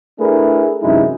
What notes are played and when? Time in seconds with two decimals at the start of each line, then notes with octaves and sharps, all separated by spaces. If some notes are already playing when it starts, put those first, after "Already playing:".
0.19 A3 D4 E4 G#4 A#4 B4
0.82 F#2 C3 E3 G#3 D#4 E4